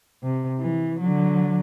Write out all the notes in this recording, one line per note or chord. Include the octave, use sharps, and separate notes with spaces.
C3
E3
D3 F#3